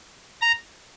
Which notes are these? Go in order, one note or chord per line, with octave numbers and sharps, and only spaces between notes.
A#5